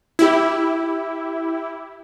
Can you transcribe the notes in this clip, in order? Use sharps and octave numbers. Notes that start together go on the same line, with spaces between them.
E4 G4